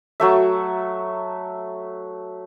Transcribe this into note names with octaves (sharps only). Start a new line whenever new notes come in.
F#3 A3 E5